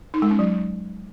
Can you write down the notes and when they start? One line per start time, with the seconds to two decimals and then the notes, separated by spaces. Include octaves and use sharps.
0.14 D#4
0.22 G#3
0.31 C#4
0.39 F#3